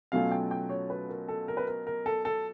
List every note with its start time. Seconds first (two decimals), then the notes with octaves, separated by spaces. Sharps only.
0.12 B2 F#3 A3 C#4 F4 F5
0.31 G5
0.51 G5
0.70 C#5
0.90 B4
1.09 A#4
1.28 A4
1.48 A#4
1.57 B4
1.68 A#4
1.87 A#4
2.06 A4
2.25 A4